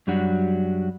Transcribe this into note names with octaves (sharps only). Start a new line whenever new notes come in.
F#2 F#3 G3 D4 F#4